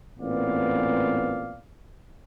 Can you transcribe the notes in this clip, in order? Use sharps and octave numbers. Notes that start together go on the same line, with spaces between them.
A1 A#2 B3 C4 D5 F5